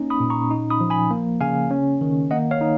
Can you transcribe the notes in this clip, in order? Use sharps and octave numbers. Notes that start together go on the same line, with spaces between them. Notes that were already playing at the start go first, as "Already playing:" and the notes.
Already playing: A#3 C#4 D#4
B5 D#6
A#2
A#5 C#6
D#4
B5 D#6
F3
G#5 B5
A#3
C#3 F5 G#5
C#4
D#3
A#3 D#5 F#5
C#5 F5
D#4